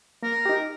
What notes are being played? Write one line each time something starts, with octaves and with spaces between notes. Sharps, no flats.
A#3 A#4
D#4 G4